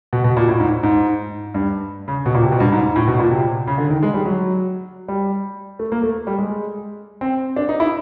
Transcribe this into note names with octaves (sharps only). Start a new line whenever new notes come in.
B2
B2
A#2
A2
G#2
G#2
G2
C#3
B2
A#2
C3
B2
G2
G#2
G#2
A2
B2
A#2
C3
C#3
D3
D#3
G#3
G3
F#3
G3
A3
A#3
A3
G3
G#3
C4
D4
D#4
E4